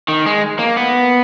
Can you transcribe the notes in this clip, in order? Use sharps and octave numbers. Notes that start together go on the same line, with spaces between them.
D#3
G#3
A#3
B3